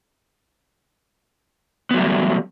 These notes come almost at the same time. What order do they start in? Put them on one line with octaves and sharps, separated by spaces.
B3 F#3 A3 G3 E3